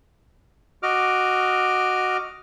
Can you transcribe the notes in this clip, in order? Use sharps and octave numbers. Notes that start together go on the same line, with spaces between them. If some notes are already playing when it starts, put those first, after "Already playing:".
F#4 D#5 D6 F6